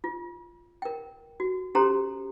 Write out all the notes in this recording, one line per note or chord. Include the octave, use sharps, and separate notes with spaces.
F4
A#4 G5
F#4
C#4 G4 A4 C5 A#5 C6